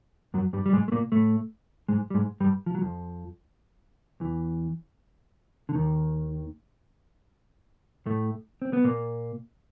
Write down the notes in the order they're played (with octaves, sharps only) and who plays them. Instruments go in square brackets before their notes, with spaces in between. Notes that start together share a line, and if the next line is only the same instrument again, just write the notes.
[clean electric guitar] F#2 F#3
G2 G3
G3
G#2 G#3
A3
A#2 A#3
A2 A3
G#2 G#3
G3
G#2 G#3
G2 G3
F3
F#3
F2 F3
E2 E3
D3
D#2 D#3
A2 A3
C4
B3
A#2 A#3